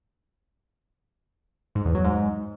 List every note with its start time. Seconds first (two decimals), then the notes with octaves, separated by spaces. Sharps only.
1.75 G#2
1.85 E2
1.95 F#3
2.04 G#2